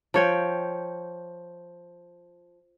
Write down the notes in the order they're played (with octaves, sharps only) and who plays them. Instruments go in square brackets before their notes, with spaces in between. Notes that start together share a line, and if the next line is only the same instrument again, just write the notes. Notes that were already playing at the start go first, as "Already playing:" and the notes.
[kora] F3 C#5 G5